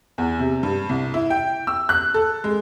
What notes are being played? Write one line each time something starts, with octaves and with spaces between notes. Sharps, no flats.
E2
C3
G2
C2
E4
G5
E6
F#6
A4
G#3